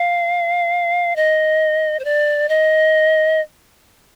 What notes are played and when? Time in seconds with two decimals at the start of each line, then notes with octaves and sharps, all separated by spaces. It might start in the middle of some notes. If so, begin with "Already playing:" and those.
Already playing: F5
1.16 D#5
1.99 C5
2.05 D5
2.49 D#5